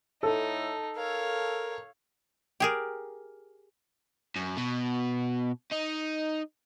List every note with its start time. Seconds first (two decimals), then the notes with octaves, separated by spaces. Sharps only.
0.23 A2 D#4 A4
0.97 A#4 C#5 F5
2.60 G4 G#4 A#4
4.36 F#2
4.57 B2
5.71 D#4